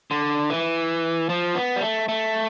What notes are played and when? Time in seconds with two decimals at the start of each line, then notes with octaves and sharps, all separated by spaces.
0.11 D3
0.50 E3
1.29 F3
1.55 B3
1.76 G3
1.82 A3
2.09 A3